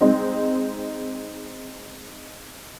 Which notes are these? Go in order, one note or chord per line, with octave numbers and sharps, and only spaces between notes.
G#3 C4 D#4